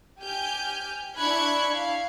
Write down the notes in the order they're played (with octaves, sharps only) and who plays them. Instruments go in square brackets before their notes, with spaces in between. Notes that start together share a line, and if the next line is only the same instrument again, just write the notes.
[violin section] G4 G5 G#5 F6 G6
D4 E4 B5 C#6 F#6 G#6
F5